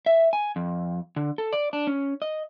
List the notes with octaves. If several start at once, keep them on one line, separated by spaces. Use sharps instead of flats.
E5
G#5
F2
D3
A4
D5
D4
C#4
D#5